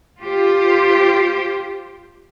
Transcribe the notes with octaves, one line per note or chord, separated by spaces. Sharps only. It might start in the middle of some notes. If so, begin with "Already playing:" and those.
F4 G4 C5